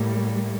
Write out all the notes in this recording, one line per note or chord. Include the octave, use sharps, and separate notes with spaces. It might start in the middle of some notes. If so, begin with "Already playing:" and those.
Already playing: A2 G3 A#3